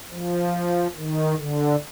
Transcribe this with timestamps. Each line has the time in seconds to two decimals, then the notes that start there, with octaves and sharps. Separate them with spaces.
0.10 F3
0.96 D#3
1.38 D3